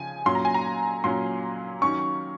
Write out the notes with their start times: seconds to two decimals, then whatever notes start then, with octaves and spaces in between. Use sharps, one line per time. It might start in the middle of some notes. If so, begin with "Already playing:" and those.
Already playing: C#3 F3 G#5
0.26 A#2 F#3 C#4 C6
0.35 A#5
0.45 G#5
0.54 A#5
1.04 A#2 F#3 C#4 C6
1.82 D#3 F#3 C#4 C#6